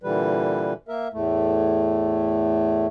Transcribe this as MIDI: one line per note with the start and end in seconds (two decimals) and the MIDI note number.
0.03 0.73 46
0.03 0.73 50
0.03 0.73 52
0.03 0.73 55
0.03 0.73 71
0.88 1.08 58
0.88 1.08 70
0.88 1.08 76
1.13 2.87 40
1.13 2.87 45
1.13 2.87 57